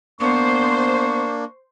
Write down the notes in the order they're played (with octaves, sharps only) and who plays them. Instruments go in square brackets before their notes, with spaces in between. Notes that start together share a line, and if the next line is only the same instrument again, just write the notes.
[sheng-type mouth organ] A#3 D4 [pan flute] B3 [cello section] C5 [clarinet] C#6